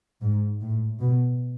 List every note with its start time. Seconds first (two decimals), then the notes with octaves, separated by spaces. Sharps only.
0.21 G#2
0.61 A2
1.01 B2